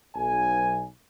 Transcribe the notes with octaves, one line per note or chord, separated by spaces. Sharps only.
B1 G#5